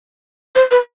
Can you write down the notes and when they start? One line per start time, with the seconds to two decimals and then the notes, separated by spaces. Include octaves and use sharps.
0.55 C5
0.71 B4